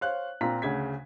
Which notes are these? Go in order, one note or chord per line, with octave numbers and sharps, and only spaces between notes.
C5 C#5 F5 F#6
A#2 C4 F4 A#5 B6
D2 C#3 G#6 B6